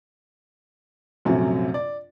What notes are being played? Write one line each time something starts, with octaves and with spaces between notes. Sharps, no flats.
A#1 F#2 C3 F#3 A3
D5